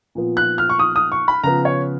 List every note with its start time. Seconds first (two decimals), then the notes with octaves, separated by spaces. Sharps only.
0.15 A#2 F3 B3
0.37 F#6
0.58 F6
0.69 C#6
0.79 D#6
0.96 D#6
1.12 C#6
1.28 B5
1.44 C#3 F3 B3 A#5
1.65 C#5